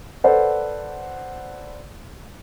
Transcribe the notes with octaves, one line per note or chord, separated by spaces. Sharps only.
A4 B4 C5 D5 F#5